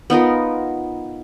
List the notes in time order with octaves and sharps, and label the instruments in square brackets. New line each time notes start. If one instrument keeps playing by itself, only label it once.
[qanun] B3 D#4 F4 A#4